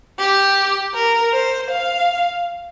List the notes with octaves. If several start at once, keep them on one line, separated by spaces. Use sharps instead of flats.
G4
A#4
C5
F5